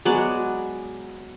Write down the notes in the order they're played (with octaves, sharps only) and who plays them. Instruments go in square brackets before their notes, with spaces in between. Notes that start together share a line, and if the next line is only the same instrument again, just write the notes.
[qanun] F#3 G#3 B3 D5